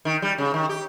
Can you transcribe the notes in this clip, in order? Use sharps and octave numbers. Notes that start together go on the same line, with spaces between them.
D#3
G3
C#3
D#3
G4